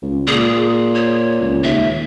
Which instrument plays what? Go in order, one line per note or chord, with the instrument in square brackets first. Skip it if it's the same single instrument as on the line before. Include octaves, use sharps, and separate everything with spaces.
[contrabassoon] C#2
[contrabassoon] A#2 [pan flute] G#4
[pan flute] C#5
[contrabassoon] C#2
[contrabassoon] D#2 [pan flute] E5